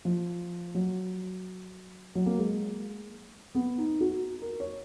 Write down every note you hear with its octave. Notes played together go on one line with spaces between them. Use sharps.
F3
F#3
F#3
A#3
G#3
B3
D#4
F#4
A#4
C#5